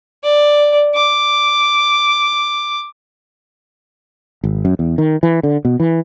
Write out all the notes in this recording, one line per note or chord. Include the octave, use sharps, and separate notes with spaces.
D5
D6
G#1
F#2
E2
D#3
E3
D3
B2
E3